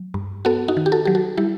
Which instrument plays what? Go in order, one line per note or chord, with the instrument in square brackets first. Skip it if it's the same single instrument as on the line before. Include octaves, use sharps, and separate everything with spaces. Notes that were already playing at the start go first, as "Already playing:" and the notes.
Already playing: [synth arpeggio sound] F#3
G2
B3 F#4 A4
D#4 F#4
D#3
G4
F#4 A4
F#3 G4
F#4 A4
G3 E4 G4